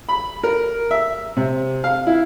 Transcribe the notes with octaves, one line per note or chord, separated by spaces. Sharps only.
B5
A#4
E5
C3
F5
E4